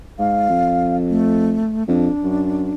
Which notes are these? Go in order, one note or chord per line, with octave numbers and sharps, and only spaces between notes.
G#2 F5
F2
A3
F2 D4
F#2